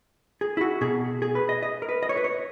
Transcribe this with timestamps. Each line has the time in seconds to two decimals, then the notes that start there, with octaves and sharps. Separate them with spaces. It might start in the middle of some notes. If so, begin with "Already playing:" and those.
0.41 G#4
0.57 E4
0.61 F#4
0.81 B2 G#4
1.22 G#4
1.35 B4
1.49 D#5
1.63 D#5
1.82 A#4
1.89 B4
2.03 D#5
2.09 C#5
2.17 B4
2.24 C#5